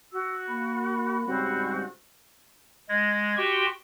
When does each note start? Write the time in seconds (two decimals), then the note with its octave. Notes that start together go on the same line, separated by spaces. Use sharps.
0.12 F#4 E6
0.48 A#3 B5
1.26 G#2 C#3 G3 C4 F#4
2.89 G#3 G#6 A#6
3.37 F#4 G4 G5 C6 C#6